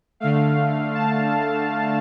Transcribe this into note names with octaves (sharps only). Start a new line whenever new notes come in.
D3 A3 F5
A5